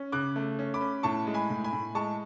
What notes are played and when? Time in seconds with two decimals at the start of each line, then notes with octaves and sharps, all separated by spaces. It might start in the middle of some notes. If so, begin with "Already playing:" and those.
Already playing: C#4
0.12 C#3 D6 F#6
0.36 A3
0.59 C#4
0.74 B5 D6
0.81 C#4
1.03 A2 A5 C#6
1.27 G#3
1.34 G#5 B5
1.50 A2
1.64 G#5 B5
1.73 A2
1.95 G#3 A5 C#6